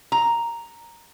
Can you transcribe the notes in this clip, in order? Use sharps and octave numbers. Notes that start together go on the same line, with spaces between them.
A#5